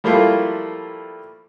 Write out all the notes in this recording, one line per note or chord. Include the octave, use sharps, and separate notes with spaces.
F3 G3 A3 A#3 E4 F4